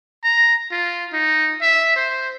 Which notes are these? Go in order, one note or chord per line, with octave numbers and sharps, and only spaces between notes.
A#5
F4
D#4
E5
C5